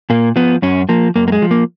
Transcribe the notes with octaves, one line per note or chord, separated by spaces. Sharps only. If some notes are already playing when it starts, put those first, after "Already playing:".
A#2 A#3
F3 B3
F#2 C#4
F3 A#3
F#2 A#3
A#3
G#3
F3
A#3